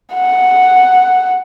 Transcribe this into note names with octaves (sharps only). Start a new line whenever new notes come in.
F#5